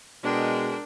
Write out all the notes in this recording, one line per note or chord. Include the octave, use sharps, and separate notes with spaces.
B2 G#3 D4 A#4 G5